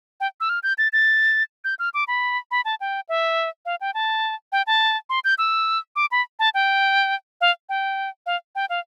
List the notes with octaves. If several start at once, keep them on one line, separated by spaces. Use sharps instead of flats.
G5
E6
F6
G6
A6
A6
G6
F6
D6
B5
B5
A5
G5
E5
F5
G5
A5
G5
A5
C6
G6
E6
D6
B5
A5
G5
F5
G5
F5
G5
F5